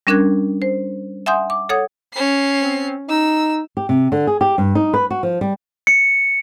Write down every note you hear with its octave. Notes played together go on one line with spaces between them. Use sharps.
G3 C#4 D4 A#4 F#6 G#6
C5
E5 F#5 G#5 C6 D#6 G6
D6
A4 C#5 F#5 D#6 G#6
C#4 C7
C4
D#4 E6
G4
C3
D3
G#4
G4
G2
D#4
B4
F#4
F3
G3
C#7